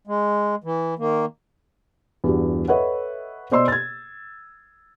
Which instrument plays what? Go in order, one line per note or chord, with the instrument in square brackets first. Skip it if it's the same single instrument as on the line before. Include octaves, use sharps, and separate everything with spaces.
[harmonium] G#3
E3
D#3 A#3
[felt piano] E2 G2 F#4
A4 B4 C#5 D#5 E5 F#5
B2 C5 D5 D#5 C6 E6
G#6 A6